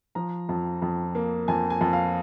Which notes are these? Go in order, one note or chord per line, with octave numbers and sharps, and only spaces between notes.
F3 A#5
F2
F2
A#3
F2 G#5
G#5
F2
F5